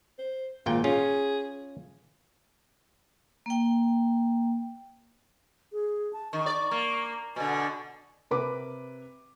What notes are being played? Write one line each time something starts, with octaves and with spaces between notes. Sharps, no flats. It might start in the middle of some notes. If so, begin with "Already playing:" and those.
C5
G#1 A#2 F4 G5
C#4 F4 G#4
A#3 G5
G#4
A5
D#3 C#6
D5
A#3
B2 D3 G#5
C3 A#4 B4 B5 D6